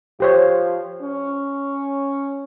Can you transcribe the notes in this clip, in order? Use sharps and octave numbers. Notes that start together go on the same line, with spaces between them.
F3 G4 C5 C#5
C#4